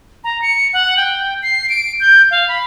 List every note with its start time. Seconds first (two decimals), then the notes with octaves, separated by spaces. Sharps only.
0.24 A#5
0.42 C#7
0.73 F#5
0.97 G5
1.43 C7
1.69 D7
2.00 G6
2.31 F5
2.48 B5